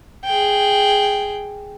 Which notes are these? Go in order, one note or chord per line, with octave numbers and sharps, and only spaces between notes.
G#4 G5